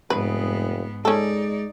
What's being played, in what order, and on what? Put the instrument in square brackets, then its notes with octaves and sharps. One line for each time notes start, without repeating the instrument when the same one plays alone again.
[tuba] F1 [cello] G#2 B3 [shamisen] B4
[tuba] G#3 [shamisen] C#4 A4 [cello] D#4 D5